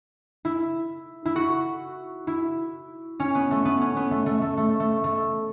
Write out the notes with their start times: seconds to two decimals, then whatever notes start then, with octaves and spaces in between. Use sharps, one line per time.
0.45 E4
1.25 E4
1.36 F#4
2.27 E4
3.20 C#4
3.35 B3
3.51 A3
3.65 B3
3.81 C#4
3.96 B3
4.11 A3
4.26 A3
4.42 A3
4.57 A3
4.80 A3
5.04 A3